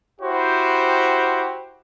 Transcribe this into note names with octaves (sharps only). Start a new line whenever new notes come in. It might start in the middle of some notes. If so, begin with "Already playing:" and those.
E4 F#4 G4 C5